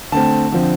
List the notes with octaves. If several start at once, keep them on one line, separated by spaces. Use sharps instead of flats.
D3 A3 C4 A5
D3 F3 C4